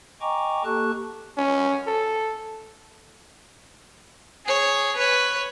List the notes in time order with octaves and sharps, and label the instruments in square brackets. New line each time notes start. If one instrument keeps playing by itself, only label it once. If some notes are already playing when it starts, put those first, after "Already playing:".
[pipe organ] D#5 G5 G#5 A#5 C#6 D6
A#3 G4 A4 A5 C#6 F#6
[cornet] C#4
A4
[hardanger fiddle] G#4 C#5
B4 C#5